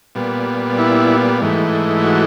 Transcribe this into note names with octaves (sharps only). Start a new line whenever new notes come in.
A#2 G3 B3
E4
G#2 E3 A3
F#4